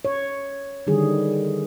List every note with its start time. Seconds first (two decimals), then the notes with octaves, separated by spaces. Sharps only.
0.05 C#5
0.87 D3 D#3 G3 G#4